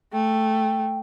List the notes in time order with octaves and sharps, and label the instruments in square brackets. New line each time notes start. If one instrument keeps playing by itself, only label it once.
[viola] A3 [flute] G5